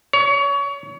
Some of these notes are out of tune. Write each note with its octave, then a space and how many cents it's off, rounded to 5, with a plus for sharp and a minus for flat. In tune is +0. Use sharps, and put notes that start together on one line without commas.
C#5 +30